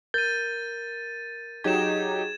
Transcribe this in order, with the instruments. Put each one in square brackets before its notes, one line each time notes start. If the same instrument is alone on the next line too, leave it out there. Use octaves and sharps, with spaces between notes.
[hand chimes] A#4 [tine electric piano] G6 [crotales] A6 D#7
[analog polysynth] F#3 D#4 G4 [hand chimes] G#4 [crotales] G#6 E7